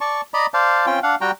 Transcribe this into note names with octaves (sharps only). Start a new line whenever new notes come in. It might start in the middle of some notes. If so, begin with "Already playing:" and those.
D5 A5 C#6
D5 D#5 A#5 B5
C5 D5 F5 A5
C4 C#4 F4 G5
D4 F5 F#5
G3 F#4 G5 A#5